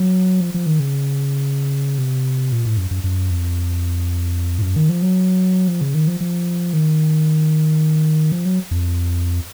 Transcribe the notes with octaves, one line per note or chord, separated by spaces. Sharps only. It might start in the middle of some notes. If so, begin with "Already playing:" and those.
Already playing: F#3
F3
F3
D#3
C#3
C3
A#2
A2
F#2
F#2
F#2
F2
A2
F#2
D#3
F3
F#3
F3
C#3
D#3
F3
F3
D#3
F3
F#3
F2